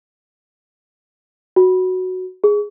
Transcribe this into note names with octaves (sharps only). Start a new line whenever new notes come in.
F#4
G#4